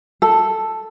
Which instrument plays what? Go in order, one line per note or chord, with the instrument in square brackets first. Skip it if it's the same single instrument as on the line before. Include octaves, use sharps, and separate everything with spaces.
[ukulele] A4